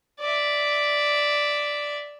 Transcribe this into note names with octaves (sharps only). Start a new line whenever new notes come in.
D5 E5